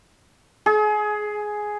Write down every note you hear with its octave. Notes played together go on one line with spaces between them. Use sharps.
G#4